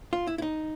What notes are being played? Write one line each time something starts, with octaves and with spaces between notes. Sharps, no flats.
F4
E4
E4
D#4